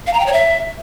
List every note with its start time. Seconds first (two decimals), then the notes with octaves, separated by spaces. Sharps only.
0.07 F5
0.13 A#5
0.20 G5
0.26 C#5
0.33 E5